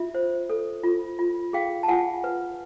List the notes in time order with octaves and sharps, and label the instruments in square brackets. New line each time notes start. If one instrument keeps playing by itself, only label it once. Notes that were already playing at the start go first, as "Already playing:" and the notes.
Already playing: [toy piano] F4 E5
C5
A4
F4
F4
G#4 F5 G5
A5
F4 F#5 G#5
B4